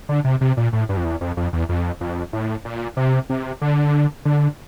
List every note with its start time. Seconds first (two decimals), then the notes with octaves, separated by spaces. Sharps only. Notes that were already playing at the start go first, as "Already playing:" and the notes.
0.09 D3
0.24 C3
0.41 C3
0.57 A#2
0.73 A2
0.89 G2
0.97 F2
1.05 E2
1.21 F2
1.37 F2
1.53 E2
1.69 F2
2.01 F2
2.33 A2
2.65 A#2
2.97 C3
3.30 C3
3.61 D3
4.25 D3